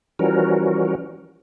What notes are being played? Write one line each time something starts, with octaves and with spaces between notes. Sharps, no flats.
E3 F3 G3 C#4 F#4 A#4